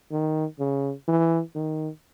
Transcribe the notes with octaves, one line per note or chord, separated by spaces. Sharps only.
D#3
C#3
E3
D#3